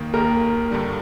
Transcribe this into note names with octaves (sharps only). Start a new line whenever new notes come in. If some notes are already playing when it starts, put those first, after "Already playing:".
Already playing: D#2 D#3 A#3
D#2 D#3 A#3 A#4
G2 D3 G3